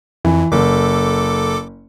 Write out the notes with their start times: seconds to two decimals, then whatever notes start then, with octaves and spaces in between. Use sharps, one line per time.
0.25 F2 E3
0.52 F#1 A4 D6